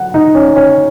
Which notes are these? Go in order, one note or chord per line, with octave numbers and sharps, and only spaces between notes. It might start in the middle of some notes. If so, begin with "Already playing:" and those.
Already playing: F#3 F#5
D#4
C#4
C#4